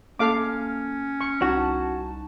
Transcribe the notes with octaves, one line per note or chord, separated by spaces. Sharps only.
A#3 C#4 A4 F5 D6
C#6
C2 D#4 F#4 A5